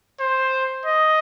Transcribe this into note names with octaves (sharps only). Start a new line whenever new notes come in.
C5
D#5